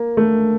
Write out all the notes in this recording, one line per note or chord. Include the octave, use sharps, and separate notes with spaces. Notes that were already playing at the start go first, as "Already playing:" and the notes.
Already playing: A#3
A3